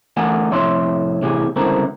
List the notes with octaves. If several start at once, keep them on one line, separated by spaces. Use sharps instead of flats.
D3 E3 A3 A#4 F#5 G#5
F2 A2 C3 C#5 E5 C6
A2 C3 E3 G4 G#4
C#2 G2 D3 C4 E4 A#4